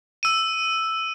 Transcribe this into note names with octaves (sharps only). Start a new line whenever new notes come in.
E6 D#7